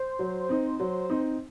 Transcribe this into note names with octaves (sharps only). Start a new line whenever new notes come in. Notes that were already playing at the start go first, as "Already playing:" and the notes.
Already playing: C5
F#3
C4 D#4
F#3
C4 D#4